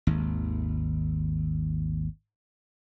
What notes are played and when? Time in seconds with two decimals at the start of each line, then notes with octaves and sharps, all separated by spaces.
0.07 G#1 D#2